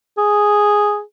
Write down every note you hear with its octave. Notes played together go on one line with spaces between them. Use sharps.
G#4